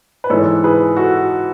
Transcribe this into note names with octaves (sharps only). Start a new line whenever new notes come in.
B4
G#2 E3 A4 C#5
G#4 B4
F#4 A4